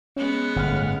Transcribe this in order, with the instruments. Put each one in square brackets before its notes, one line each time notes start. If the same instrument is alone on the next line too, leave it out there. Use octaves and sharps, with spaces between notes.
[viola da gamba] G#3 B3 [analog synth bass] C#4
[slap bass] G1 [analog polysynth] A2 F#5 F6